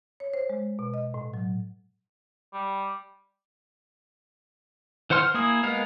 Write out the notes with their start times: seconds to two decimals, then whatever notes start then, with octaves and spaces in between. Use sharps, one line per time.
0.20 C#5
0.34 C5
0.50 G#3
0.79 B2
0.94 D#5
1.14 A2
1.34 F#3
2.54 G3
5.10 E3 C5 F#5 C6 F6
5.34 A#3 E4 G#4 D#6
5.63 G#3 B3 A#4 F5